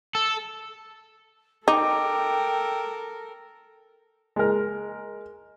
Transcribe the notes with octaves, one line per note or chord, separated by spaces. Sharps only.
A4
D#4 A4 A#4 G5 D6
G#3 A#4